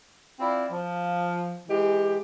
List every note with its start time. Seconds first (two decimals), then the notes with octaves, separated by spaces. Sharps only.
0.40 C4 E4 F4 D5
0.71 F3
1.69 E3 G#3 G4